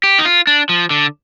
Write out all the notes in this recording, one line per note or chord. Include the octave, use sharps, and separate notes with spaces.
G4
D#4
F4
D4
F3
D3